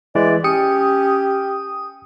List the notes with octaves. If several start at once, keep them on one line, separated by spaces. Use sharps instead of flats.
E3 G#3 D5
C#4 G4 D#6 C#7